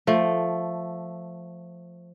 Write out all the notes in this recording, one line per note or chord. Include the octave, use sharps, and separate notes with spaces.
F3 A3